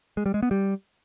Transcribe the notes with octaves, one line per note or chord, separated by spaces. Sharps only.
G#3
G3
G#3
B3
G3